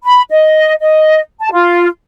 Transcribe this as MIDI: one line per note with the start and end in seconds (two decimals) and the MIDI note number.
0.04 0.22 83
0.30 0.74 75
0.81 1.19 75
1.40 1.48 81
1.52 1.87 65